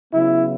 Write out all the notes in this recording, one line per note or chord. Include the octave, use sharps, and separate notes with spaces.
C#3 F#3 B3 E4